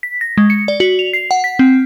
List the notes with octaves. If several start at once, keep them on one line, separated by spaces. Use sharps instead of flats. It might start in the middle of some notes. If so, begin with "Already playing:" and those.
B6
A#6
G#3
C#7
D5
F#4
F7
C7
F#5
B6
C4